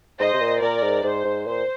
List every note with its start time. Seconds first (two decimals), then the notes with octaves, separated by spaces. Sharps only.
0.19 G#2 C5 D#5
0.34 C3
0.40 A#2
0.61 A#2 A#4 D5
0.83 G#2
1.04 G#2 C5
1.25 G#2
1.46 A#2 C5